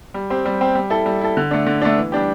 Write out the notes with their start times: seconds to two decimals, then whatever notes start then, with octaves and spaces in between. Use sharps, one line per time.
0.14 G3
0.30 C4 G4
0.45 G3
0.61 C4 G4
0.75 G3
0.90 E4 A4
1.06 G3
1.21 E4 A4
1.37 D3
1.51 A3 D4
1.66 D3
1.82 A3 D4
1.96 E3
2.12 G3 D4 G4